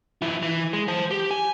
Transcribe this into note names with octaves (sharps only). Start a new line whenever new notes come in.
F3 E4
E3
G#3
C5 A5
G4
G#5